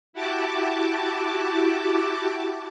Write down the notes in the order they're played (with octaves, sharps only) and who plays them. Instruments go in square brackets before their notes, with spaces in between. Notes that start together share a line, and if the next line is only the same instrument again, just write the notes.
[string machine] E4 F#4 G4 A5 D6